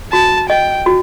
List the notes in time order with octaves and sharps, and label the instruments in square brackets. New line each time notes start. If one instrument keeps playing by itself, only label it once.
[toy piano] F#4 [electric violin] A5
[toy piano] D#5 [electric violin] G5
[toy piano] F#4